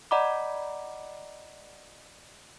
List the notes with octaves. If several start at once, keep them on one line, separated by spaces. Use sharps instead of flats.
D5 D#5 F#5 A#5 B5 D6